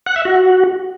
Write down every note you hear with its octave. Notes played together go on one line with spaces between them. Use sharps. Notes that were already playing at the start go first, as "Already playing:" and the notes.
F#5
E5
F#4